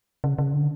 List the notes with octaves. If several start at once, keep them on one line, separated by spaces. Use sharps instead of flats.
C#3
C#3
D3